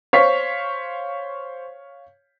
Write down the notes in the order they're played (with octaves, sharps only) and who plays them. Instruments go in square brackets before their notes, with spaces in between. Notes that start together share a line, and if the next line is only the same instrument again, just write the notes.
[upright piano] C5 C#6 B6 [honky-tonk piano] C#5 F5